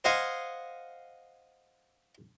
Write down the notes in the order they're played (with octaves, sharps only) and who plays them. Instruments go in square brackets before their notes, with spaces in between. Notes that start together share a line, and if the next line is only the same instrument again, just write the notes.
[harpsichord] C5 D#5 F5 F#5 G#5